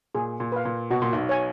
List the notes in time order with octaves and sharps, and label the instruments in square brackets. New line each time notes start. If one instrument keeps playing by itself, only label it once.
[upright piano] A#2 [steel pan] G#4
[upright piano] A#2
[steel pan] B4 F5
[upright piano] A#2
[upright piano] B2 [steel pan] F#4
[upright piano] A#2
B1 B2
[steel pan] C#5 G#5